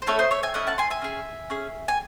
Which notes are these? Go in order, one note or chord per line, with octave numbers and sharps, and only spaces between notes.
C5
A3 C#4 E4 A4 C#5
C5 D#5
C#5 E5
E5 G#5
A3 C#4 E4 D#5 F#5
F#5 A5
G#5 C6
E5 G#5
C#4 G#4
C#4 G#4
G#5